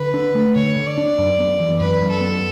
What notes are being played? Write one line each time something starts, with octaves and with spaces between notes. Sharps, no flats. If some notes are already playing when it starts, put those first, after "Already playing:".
Already playing: D3 B4
D4
A3
D3 C#5
D3
D5
D4
F#2
B3
E3
F#2 B4
F#2
A4
B3